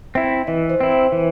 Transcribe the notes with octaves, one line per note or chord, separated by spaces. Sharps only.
C4 E4 E5
E3 D#5
C5
C4 E4
C5
E3